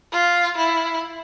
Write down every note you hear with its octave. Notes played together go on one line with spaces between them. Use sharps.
F4
E4